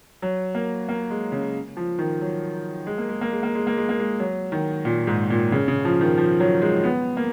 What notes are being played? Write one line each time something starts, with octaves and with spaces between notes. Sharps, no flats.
F#3
A#3
A#3
G#3
C#3
F3
D#3
F#3
G#3
A#3
G#3
A#3
G#3
A#3
G#3
A#3
G#3
A#3
G#3
F#3
D#3
A#2
G#2
A#2
C#3
C#3
F3
D#3
F3
F#3
G#3
B3
A#3